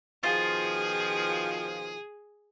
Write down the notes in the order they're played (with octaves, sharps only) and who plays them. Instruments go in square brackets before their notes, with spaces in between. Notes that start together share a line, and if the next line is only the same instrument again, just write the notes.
[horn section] B2 D#3 F3 [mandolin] F4 [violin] G#4